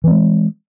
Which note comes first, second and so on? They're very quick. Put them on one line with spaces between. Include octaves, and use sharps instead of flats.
E3 C4 G#3